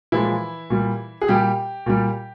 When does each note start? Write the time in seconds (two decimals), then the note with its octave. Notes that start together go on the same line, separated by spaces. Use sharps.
0.12 A#2 E3 F3 G#3 E4
0.70 A#2 G3
1.22 G#4
1.28 A#2 G3 G4
1.86 A#2 G3